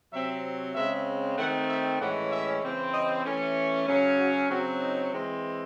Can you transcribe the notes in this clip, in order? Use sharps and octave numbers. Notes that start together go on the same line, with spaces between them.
C3 F#3 C4 E5
C#3 G#3 C4 E5
D#3 A3 C4 F#5
E5
A2 E3 G#3 C#4 F#5
E5
C#3 E3 C4
D#5
E3 A3 C#4
C#3 F#3 C#4
F#4
C#3 F#3 C4 F#4
D#4
E3 G#3 C4